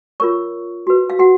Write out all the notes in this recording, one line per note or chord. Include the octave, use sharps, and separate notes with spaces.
F4 A#4 C#5 C#6
F#4 B4
F5
F#4 F#5